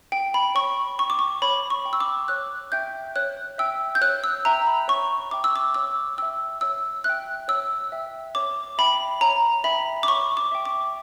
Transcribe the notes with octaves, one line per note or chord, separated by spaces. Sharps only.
G5
B5
C#5 C#6
G5 C#6
D6
C#6
C#5 B5
C#6
G5
E6
D6
C#5 F#6
E5 G5 G6
C#5 F#6
E5 G5 E6
G6
C#5 F#6
E6
E5 G5 A#5
B5
C#5 C#6
E5 G5 D6
E6
D6
C#5 E6
E5 G5 E6
C#5 E6
E5 G5 F#6
C#5 E6
E5 G5
C#5 D6
E5 G5 B5
C#5 A#5
E5 G5 B5
D6
C#5 C#6
D6
E5 G5
D6